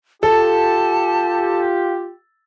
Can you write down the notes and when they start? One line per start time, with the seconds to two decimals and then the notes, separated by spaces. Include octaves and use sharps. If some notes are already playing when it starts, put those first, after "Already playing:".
0.23 F4 G4 A4 A5